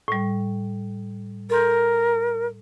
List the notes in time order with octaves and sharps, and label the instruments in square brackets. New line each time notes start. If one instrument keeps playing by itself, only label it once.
[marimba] A2 G3
[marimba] A4 C6 G6 [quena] A#4